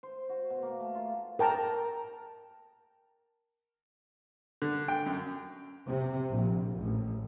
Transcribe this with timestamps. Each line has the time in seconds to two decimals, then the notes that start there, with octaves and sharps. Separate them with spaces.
0.03 C5
0.29 F#4
0.50 B2
0.63 A#3
0.80 A3
0.95 F4
1.39 A#4 G5 A5 A#5
4.62 D3
4.88 G5
5.06 F#2
5.85 C3
6.31 A#1
6.76 A1